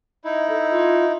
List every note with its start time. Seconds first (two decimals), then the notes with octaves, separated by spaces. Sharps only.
0.25 D#4 E4 D#5
0.49 A4
0.71 F4